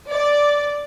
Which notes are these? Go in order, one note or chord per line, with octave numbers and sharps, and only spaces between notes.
D5